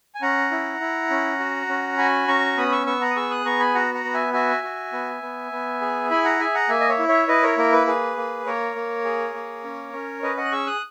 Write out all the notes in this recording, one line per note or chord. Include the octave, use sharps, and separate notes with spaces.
G#5
C#4 F#5 A#5
E4
E4
C#4
F#4
C#4
F#4 G#5 B5
C#4 A#5 C#6
B3 B5 D#6
C#6 E6
B3 C#6 E6
F#5 A#5
D#6
G#4 C#6 E6
D#6 F#6
B3 A#5 C#6
G#5 B5
F#4 F#5 A#5
F#5 A#5
B3
E5 G#5
F#4 E5 G#5
F#4
B3
B3
B3
G#4
E4 G#5 B5
F#5 A#5
G#4 E5 G#5
F#5 A#5
A#3 E5 G#5
D#5
C#5 E5
E4
C#5 E5
E4 B4 D#5
A#4 C#5
A#3 A#4
B4
G#4 B4
A#3
A#3 A#4 C#5
A#3
G#4
A#3
C#4
C#4
C#4 B4 D#5
D#5 F#5
F#6
G#4 C#6 E6
D#6 F#6